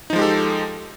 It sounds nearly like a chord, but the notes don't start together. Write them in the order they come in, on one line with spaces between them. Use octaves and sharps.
D#4 F3 G#3 G4 A4